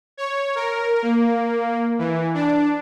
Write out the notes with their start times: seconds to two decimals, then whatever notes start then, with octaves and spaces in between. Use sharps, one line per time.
0.17 C#5
0.55 A#4
1.02 A#3
1.99 E3
2.34 D4